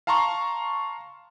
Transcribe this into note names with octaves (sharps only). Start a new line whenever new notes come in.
F5 A5 A#5 C6 C#6